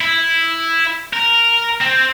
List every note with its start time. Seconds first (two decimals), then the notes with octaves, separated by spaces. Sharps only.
0.01 E4
1.13 A#4
1.81 C4